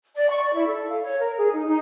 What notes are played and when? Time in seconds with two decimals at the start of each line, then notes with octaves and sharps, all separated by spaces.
0.15 D5
0.29 C#6
0.41 D5
0.54 E4
0.67 A4
0.88 F5
1.03 C#5
1.20 A#4
1.37 G#4
1.52 D#4
1.67 D#4